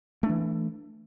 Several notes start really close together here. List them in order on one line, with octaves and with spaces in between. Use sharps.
A3 D4 E3